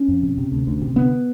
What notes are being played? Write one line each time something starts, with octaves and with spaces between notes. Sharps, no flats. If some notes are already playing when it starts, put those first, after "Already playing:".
Already playing: C#4
F2
C3
C3
D2
D2
C3
D3 B3